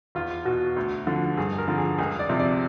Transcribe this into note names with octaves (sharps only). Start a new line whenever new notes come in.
E2 F4
B2 F#4
D2
D3 F3
G2 G#4
A#4
D3 F3
G#4
C#2 G#4
D5
C3 F3
D5